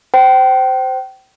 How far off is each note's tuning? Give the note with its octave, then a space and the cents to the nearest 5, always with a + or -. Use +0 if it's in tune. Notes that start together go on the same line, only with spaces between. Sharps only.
C5 -10 G5 -30